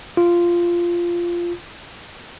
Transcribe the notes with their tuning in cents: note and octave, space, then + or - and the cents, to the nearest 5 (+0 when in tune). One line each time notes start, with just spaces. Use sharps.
F4 -10